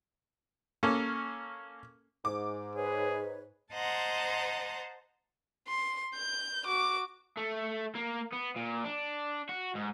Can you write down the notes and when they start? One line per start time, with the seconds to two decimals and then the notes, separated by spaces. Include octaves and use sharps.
0.83 A#3 C#4 A4
2.25 G#2 D6
2.75 G#4 B4 C#5
3.73 C5 D#5 F#5 A5 A#5 C6
5.68 C6
6.15 G6
6.66 F#4 D6
7.37 A3
7.95 A#3
8.32 B3
8.56 A#2
8.84 D4
9.49 F#4
9.75 G#2